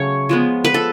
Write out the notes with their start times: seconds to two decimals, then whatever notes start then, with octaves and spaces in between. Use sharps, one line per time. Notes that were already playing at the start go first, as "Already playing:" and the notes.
Already playing: C#3 F#3 A3 C#5
0.29 F3 G#3 B3
0.65 B4
0.74 A4